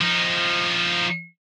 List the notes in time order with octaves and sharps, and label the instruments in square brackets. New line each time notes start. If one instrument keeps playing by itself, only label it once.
[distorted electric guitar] F3 D#4